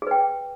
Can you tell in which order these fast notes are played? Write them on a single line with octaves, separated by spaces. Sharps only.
G#4 B4 G5